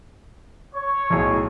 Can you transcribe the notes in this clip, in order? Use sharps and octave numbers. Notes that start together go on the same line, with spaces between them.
C#5
B1 A2 G#4